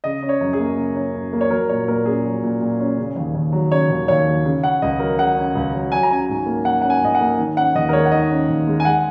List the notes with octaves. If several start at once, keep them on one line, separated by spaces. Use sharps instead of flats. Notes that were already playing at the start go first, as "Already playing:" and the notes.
C#3 D#5
C#4
C#5
F#2
G#4
A#3
C#3
C#4
F#2
A#3
C#5
F#3 A#4
A#2 C#5
A#2 A#4
C#4 G#4
F#3
A#2
A#2
C#4
C#3
D#2
D#2
F#3
C#3 C#5
D#2
D#2 C#5
F#3
C#3
C#4 F#5
C#2 D#5
F#3 A#4
C#3 F#5
C#4
C#2
F#3
F#3 G#5
A#5
C#4 G#5
G#2
A#3
F#3 F#5
C#4 F#5
G#5
G#2 D#5
F#5
A#3
D#3
C#4 F#5
D#2 D#5
A#4
G#3 C#5
F#5
D#3 D#5
C#4
D#2
G#3
G#5
G#3 F#5